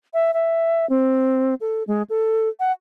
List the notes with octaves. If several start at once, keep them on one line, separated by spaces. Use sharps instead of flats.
E5
E5
C4
A4
G#3
A4
F#5